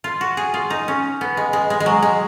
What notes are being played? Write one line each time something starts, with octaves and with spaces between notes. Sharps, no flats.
F4
F#4
G#4
F4
D#4
C#4
B3
G#3
G#3
G#3
G#3
F#3
G#3